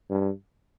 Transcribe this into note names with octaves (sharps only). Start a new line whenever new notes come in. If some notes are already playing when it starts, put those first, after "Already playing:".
G2